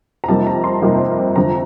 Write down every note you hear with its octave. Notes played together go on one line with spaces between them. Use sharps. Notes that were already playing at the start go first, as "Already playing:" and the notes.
A#5
F2 C3 G3 A#3 D#4 A5
A#5
C6
F2 C3 G3 A#3 D#4
F2 D3 G3 A#5